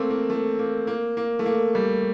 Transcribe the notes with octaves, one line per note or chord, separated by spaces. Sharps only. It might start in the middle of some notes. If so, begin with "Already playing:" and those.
Already playing: A3 A#3 C4
A#3
A3
A#3
A#3
A#3
A3
A#3
G3